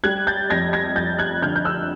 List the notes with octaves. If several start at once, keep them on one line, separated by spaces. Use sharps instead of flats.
G3 F#6 G#6
G6 A6
F2 G#6 A#6
G#6 A#6
F2 G6 A6
F#6 G#6
D3 F6 G6
G6
E6 F#6